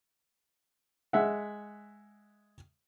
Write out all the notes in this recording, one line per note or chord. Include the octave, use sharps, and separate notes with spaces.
G#3 E5 F#5